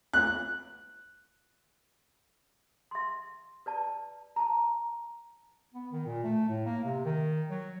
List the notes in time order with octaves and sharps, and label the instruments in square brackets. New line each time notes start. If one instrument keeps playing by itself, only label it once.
[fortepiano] F#6
[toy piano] E5 C6
B4 D5 A5
A5 A#5
[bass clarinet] B3
D#3
A#2
A3
A2
A#3
C3
D#3
F#3